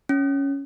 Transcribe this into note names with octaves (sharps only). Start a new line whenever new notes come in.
C#4